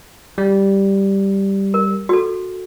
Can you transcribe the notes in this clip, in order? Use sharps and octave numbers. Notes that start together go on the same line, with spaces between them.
G3
A#4
F#4 A4